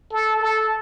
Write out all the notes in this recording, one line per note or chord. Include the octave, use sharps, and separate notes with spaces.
A4
A4